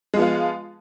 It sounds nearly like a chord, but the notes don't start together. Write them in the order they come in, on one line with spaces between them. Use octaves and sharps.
G#3 F3 B3 F4